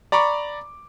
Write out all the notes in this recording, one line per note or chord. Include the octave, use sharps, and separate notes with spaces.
D5 A#5 B5 C#6 D6